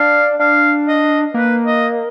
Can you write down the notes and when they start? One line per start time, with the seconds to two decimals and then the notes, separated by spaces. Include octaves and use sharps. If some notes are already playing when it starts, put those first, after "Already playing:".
Already playing: D4 F5
0.40 D4 F5
0.88 D#5
1.34 A#3 B4
1.65 D#5